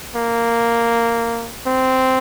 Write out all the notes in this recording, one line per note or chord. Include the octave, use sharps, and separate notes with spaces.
A#3
C4